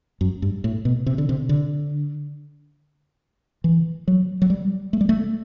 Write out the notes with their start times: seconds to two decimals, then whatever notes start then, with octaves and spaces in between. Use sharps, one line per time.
0.21 F#2
0.42 G2
0.64 A2
0.85 B2
1.06 C3
1.18 D3
1.29 C3
1.49 D3
3.64 E3
4.08 F#3
4.42 F#3
4.50 G3
4.93 A3
5.01 G3
5.09 A3